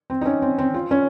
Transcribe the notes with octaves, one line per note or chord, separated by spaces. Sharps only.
C4
D#4
C#4
C4
C4
F4
C#4